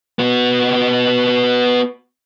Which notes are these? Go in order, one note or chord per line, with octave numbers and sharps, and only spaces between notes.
B3 F#4